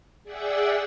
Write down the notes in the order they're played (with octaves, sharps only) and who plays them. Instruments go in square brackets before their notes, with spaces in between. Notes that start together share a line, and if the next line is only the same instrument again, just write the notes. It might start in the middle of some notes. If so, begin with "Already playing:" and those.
[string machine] G#4 D5 E5 F#5 G5 E6